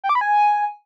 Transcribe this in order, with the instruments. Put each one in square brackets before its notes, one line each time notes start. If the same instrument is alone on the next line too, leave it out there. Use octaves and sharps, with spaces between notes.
[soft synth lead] G5
D6
B5
G#5